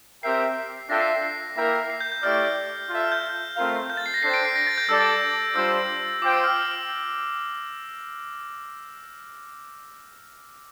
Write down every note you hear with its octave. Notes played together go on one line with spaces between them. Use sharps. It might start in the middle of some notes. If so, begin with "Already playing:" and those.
C4 G4 A#4 E5 G5 C7
D4 F4 A4 E5 G5 A#6
C7
C7
C7
A#3 E4 A#4 E5 G5
C7
G6
G6
A3 E4 G4 D5 F6
F4 A4 E5
F6
G6
A3 C4 F4 A#4 F5
G6
A6
C7
A#6
D4 A4 C5 G5 C7
D7
C7
A#6
A6
G6
G3 D4 A4 D5 E6
G3 D4 F4 C5 E6
F4 C5 G5 D6
E6
F6